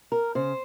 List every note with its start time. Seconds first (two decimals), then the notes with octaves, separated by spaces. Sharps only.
0.12 A#4
0.35 C#3 C5